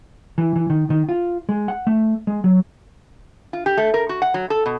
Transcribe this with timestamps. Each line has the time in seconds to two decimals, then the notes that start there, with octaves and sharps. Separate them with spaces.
0.38 E3
0.56 E3
0.70 D#3
0.90 D#3
1.09 F4
1.49 G#3
1.68 F#5
1.87 A3
2.27 G#3
2.44 F#3
3.53 F4
3.66 G4
3.77 A3
3.94 A#4
4.09 F#4
4.22 F#5
4.34 F#3
4.50 A4
4.66 B2